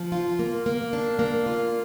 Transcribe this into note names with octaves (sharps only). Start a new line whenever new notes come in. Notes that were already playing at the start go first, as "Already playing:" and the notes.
Already playing: F3
F4
A#3
A#3
D4
A#3
F4